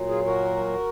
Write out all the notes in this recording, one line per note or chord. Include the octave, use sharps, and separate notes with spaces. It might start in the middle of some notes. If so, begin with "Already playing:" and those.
Already playing: A#2 F#3
F4 G#4
F#4 A#4